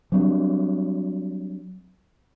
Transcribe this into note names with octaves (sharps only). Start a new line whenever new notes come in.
F#3 G3 C4 D4